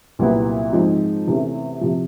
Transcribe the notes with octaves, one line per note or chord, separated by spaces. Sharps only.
C2 A#2 F#3 B3 E4
G#2 F3 G#3 C4 D#4
E2 C3 E3 A3 C#4
C3 F3